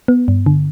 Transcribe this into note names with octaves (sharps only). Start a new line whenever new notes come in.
B3
G2
D3